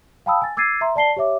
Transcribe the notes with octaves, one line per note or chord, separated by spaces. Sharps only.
F5 G5 A5 B5 D#6 E6
G#5 A6
D6 E6 G#6 A6 C7 D#7
E5 A#5 C6
D5 A5 C7 G7
G4 C#5 E5 D6